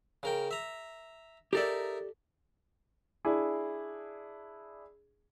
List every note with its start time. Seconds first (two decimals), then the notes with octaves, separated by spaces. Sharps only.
0.23 C#3 A#4 G5
0.51 E5 A#5
1.53 D#4 G4 A4 A#4 D5 E5
3.25 D4 E4 G#4